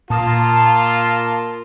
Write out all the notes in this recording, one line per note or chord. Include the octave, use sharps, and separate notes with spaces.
A#2 A#3 F4 A5 D#6